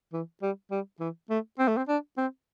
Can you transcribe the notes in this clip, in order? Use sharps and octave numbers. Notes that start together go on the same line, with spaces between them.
E3
G3
G3
E3
A3
C4
A3
C4
D4
C4